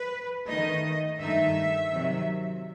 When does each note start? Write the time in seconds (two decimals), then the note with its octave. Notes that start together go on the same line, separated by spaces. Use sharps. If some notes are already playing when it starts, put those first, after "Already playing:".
Already playing: B4
0.47 D#3 A3 D#4 D#5
1.20 G2 D#3 A3 D#4 E5
1.92 C3 D#3 F#3